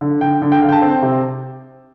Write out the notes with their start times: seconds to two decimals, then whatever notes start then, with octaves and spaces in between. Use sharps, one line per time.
0.01 D3
0.21 D3 G5
0.42 D3
0.52 G5
0.62 D3 F5
0.69 G5
0.72 A5
0.82 C4
1.02 C3